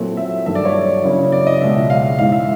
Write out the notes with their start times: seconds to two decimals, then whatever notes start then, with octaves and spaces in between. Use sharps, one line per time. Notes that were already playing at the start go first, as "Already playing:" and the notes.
Already playing: A#2 F#3 A3 C4 E4
0.17 E5
0.46 G2 D#3 F#3 A3 E5
0.55 D5
0.65 C#5
1.04 C#3 F#3 A#3 C#4 E4
1.32 D5
1.47 D#5
1.61 C#2 B2 G#3 C#4 E5
1.90 F5
2.19 G#2 E3 G#3 F5
2.32 E5